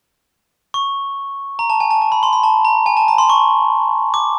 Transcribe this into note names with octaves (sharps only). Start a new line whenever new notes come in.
C#6
A#5
A5
G#5
A5
A5
B5
C6
B5
A5
A#5
G#5
A5
A#5
C6
C#6
D6